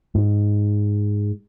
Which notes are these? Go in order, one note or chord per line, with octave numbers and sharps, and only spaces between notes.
G#2